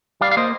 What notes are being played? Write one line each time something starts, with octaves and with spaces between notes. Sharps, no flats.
G3 D5 F5
F5
A#3 C5 D#5